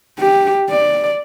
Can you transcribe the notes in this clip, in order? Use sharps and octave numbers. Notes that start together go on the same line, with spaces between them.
G4
D5